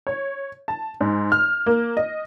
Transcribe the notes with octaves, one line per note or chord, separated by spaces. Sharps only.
C#5
A5
G#2
F6
A#3
D#5